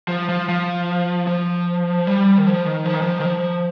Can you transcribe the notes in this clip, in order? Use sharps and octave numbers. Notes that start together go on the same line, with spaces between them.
F3
F3
F3
F3
G3
D#3
F3
D#3
F3
D#3
F3
D#3
F3